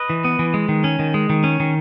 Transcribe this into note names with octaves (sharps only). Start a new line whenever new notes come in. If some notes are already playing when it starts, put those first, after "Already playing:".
Already playing: B4 D#5
E3
B3
E3
G#3
D#3
C#4
D#3
G#3
D#3
C#4
D#3